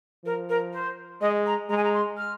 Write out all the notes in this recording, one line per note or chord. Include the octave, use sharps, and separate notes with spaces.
F3 A#4
A#4
C5
G#3 D#5
A#5
G#3 A#5
G#5
A#5
C6
F6